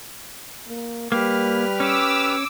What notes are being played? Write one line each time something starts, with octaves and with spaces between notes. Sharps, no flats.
A#3
G3 A#3 G4 B4 F6
C#4 D6 E6